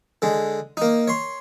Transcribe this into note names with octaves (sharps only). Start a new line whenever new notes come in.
D3 G#3
A#3 D#4
C#5 C6